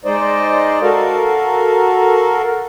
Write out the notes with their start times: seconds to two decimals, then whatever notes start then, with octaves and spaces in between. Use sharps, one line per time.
0.05 G#3 D#4 C5 D5 D#5
0.82 F#4 A4 A#4 F5